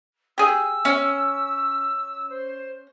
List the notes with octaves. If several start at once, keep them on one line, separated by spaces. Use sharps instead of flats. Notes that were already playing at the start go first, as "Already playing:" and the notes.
G4 G#4 E6
C#4
C5